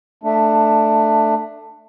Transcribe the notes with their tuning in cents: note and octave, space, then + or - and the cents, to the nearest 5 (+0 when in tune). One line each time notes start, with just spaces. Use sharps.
A3 +5 D4 +15